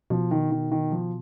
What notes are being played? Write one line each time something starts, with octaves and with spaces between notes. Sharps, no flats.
B2 F3
D#3
D#3
D#3
F3